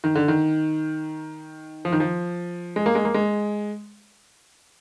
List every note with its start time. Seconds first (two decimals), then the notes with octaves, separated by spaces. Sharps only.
0.04 D#3
0.15 D3
0.28 D#3
1.85 F3
1.92 D#3
2.00 F3
2.76 G#3
2.86 A#3
2.95 G#3
3.05 A#3
3.14 G#3